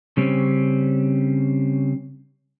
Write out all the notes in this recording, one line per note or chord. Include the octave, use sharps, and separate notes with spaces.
C#3 G3 C4 C#4